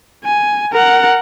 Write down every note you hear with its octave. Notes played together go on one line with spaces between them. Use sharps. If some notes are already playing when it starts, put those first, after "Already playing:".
G#5
A#4 F#5